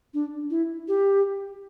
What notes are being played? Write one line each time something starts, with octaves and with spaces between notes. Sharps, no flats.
D4
E4
G4